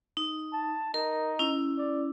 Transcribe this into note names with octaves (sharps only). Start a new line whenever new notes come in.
D#4
A5
D#4 A#4
C#4 E4
D5